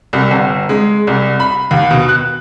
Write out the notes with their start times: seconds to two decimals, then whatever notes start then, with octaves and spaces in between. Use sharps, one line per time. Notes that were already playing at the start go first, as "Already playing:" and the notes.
0.13 C2
0.31 G1
0.69 G#3
1.07 C2
1.40 B5
1.71 D#2
1.91 B2
2.09 F#6